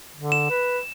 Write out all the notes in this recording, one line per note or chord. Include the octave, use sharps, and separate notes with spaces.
D3
E7
B4